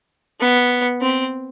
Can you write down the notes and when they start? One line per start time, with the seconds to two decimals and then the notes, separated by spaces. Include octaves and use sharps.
0.40 B3
1.01 C4